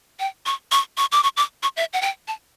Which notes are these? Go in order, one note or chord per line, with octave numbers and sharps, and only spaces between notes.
G5
C#6
C#6
C#6
D6
C#6
D6
C#6
E5
F#5
G5
A5